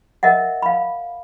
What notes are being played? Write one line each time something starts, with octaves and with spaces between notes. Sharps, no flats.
A#4 D#5 E5 F#5
F5 B5